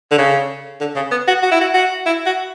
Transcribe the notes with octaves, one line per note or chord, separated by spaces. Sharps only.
D3
C#3
D3
C#3
B3
F#4
F#4
E4
F#4
F#4
E4
F#4